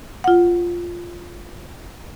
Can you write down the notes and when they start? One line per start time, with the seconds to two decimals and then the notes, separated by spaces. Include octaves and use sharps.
0.24 F4 F#5